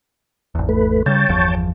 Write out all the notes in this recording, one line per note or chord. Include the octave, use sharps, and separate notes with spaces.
G#1 E2
A3 B4
C#3 G3 C#5 G5 A5
G1 E2 F3